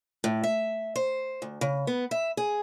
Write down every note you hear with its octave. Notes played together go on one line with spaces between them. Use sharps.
A2
E5
C5
D2
C#3
B3
E5
G#4